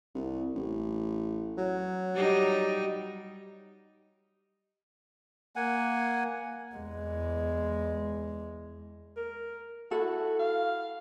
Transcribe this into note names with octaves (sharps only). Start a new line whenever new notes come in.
C2
A1
F#3
G3 D#4 G4
A#3 F#5 G#5
E2 G#3
A#4
E4 F#4 A4
F5